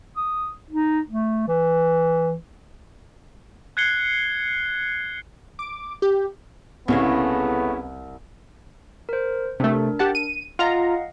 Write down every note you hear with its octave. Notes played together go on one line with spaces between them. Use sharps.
D#6
D#4
A3
E3
F#6 G#6 C7 C#7 G7
D6
G4
C2 C#3 G#3 A3 B3 C#4 E4
A#4 C5
C3 A3 D4 A#4
G4 F#5 A5
D#7
F4 D#5 F5 F#5 A#5